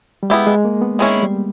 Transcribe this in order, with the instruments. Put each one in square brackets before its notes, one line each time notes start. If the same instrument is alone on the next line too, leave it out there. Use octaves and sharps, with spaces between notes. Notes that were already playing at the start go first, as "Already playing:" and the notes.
[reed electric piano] G3
[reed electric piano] G#3 [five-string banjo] B3 E4 G4
[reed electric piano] G#3
A#3
B3
[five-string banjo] D#3 G#3 C#4 E4
[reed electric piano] G3